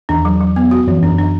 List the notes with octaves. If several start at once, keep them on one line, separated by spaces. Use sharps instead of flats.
E2 D4
F#3
F#3
B3
F#4
F#2 E3
F#2 D4
D4